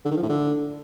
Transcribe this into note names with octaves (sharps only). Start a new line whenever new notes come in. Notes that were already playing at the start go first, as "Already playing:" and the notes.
D3
D#3
F3
A2
D3